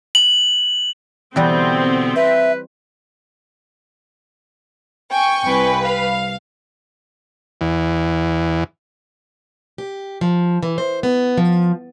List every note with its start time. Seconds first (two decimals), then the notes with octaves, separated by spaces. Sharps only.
0.15 F#7
1.36 B2 D3 E3 G3 B3 C4
2.16 B4 E5
5.11 G5 G#5 C#6
5.43 C2 B4
5.84 F5
7.61 E2
9.78 G4
10.21 F3
10.63 E3
10.78 C5
11.03 B3
11.37 F3